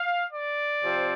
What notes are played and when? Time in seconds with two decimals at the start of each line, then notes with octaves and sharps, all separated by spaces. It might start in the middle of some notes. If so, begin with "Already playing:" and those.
Already playing: F5
0.31 D5
0.83 C3 F3 C4